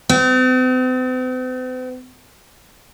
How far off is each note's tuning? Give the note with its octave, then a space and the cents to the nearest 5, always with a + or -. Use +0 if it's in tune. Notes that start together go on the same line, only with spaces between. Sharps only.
C4 -45